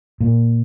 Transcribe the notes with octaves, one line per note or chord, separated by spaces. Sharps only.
A#2